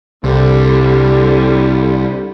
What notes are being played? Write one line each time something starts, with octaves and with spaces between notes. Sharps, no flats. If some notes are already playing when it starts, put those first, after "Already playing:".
C2 D3 G3